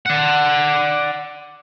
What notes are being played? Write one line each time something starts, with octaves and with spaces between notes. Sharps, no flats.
D5 F#5